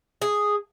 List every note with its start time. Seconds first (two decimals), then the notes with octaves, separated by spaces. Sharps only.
0.22 G#4